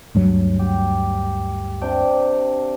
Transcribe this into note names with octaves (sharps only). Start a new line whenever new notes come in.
D2 G2 F#3
G4
C3 D4 G5